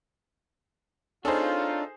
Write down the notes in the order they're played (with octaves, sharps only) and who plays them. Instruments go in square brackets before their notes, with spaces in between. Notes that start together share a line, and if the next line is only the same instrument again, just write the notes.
[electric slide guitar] D4 C#5 [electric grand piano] D#4 A4 [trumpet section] F4 [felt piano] G#4 C5